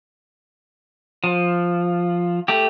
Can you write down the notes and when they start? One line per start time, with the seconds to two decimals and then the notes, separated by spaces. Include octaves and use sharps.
1.24 F3
2.48 A3 G4